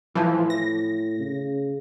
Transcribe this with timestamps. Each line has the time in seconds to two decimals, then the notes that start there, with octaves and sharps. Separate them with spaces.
0.15 A2 E3 F3
0.50 A#6
1.20 C#3